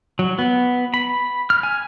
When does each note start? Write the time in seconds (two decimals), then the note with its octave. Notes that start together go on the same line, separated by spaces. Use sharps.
0.19 F#3
0.39 B3
0.94 B5
1.50 F6
1.63 G#5